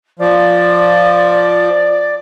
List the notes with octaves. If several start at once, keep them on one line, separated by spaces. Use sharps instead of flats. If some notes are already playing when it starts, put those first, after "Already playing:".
F3 D5